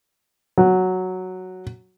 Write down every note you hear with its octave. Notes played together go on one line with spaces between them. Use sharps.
F#3